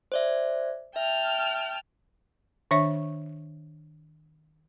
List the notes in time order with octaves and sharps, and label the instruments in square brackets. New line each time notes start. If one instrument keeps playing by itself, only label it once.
[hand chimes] C5 D5 E5
[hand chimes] E5 [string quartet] G5 A5 F6
[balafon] D#3 D4 C#5 E5 C#6